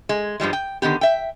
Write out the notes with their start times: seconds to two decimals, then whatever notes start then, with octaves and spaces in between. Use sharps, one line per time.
0.09 G#3
0.40 G2 F3 G3 G#3
0.53 G5
0.82 D3 D#3 B3 G4
1.01 E5 G5